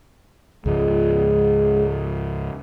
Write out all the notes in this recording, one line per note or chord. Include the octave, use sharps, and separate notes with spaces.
C#2 G#2 F3 G#3